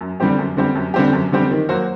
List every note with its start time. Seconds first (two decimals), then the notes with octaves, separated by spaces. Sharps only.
0.01 F#2
0.20 D3 G3 C4 G4
0.39 F#2
0.57 D3 G3 C4 G4
0.75 F#2
0.94 D3 G3 C4 G4
1.13 F#2
1.32 D3 G3 C4 G4
1.51 D#3
1.69 F#3 A#3 F#4 C5